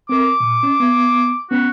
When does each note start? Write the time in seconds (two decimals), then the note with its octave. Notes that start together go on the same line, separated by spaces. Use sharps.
0.09 C4 A#4 D6
0.40 A#2
0.63 C#4
0.80 B3
1.51 B3 C#4 F#4